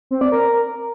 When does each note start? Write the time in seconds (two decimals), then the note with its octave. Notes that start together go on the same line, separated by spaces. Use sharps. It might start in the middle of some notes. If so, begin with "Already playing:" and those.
0.11 C4
0.21 D5
0.32 A#4